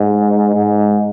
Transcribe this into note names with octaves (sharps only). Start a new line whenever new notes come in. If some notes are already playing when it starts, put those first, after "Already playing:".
Already playing: G#2
G#2